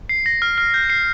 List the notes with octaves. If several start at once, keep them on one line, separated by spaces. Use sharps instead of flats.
C7
A#6
F6
F6
G6
C7